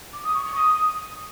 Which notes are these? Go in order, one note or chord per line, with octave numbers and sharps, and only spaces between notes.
D6
D#6
C#6
C#6
D#6